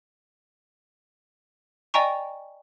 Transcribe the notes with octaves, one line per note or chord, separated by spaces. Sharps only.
D5 D#5 G5 G#5 A#5 C#6